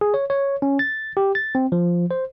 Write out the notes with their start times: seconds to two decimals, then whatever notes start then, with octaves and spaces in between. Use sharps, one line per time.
0.01 G#4
0.14 C#5
0.30 C#5
0.62 C#4
0.79 A6
1.17 G4
1.35 A6
1.55 C4
1.72 F3
2.11 C5